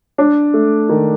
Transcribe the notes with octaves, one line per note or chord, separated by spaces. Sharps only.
D4
A3
D#3